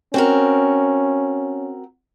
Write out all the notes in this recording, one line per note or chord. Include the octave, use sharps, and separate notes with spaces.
C4 C#4 F#4 A#4